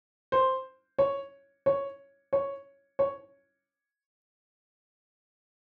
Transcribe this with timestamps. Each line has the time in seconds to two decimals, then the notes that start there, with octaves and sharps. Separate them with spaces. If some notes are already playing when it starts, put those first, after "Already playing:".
0.32 C5
0.99 C#5
1.66 C#5
2.33 C#5
2.99 C#5